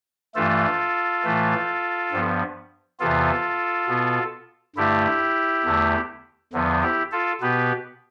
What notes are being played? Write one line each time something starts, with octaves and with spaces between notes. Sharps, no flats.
G2 E3 A3 F4 A4
A2 E3 A3
G2 F3 B3
E2 C3 E3 B3 F4 A4
B2 B3
G2 D3 A3 E4 G4
E2 D3 A3
E2 D3 F3 B3
E4 G4
F4 A4
B2 B3 G4 B4